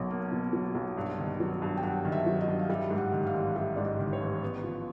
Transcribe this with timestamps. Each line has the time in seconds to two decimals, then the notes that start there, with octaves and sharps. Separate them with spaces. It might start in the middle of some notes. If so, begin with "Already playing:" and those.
Already playing: B1 B2 F#3 A#3
0.10 A#3
0.32 B2
0.53 F#3
0.75 B1
0.97 G2
1.18 D#3
1.40 F#3
1.62 G2
1.77 G5
1.83 G2 F#5
2.05 D#3
2.12 E5
2.26 F#3
2.41 D#5
2.47 G2
2.59 F5
2.70 G3 E5
2.91 G#2
2.98 F#5
3.12 D#3
3.27 F5
3.34 A1
3.56 G3 E5
3.76 G#2 D5
3.85 D#5
3.99 D#3
4.13 C#5
4.21 A1
4.42 B3
4.64 F3